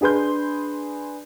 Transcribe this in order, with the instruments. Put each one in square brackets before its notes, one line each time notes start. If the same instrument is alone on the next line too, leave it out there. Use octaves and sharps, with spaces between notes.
[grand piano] D4 G#4 B4 C6 G6